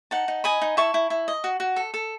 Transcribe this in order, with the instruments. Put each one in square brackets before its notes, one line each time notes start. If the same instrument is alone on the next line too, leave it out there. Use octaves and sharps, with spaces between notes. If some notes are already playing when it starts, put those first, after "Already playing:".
[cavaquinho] D#4 F#5 A5
D#4
D#5 G#5 B5
D#4
E4 A5 C#6
E4
E4
D#5
F#4
F#4
A4
A4